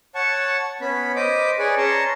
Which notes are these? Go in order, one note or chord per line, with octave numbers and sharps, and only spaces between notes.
C#5 F#5 A5 C#6
B3 C#4 B5
C5 D#5 B5 D6
G#4 B4 C#5 D5
C#4 A5 A#5 C6 C#6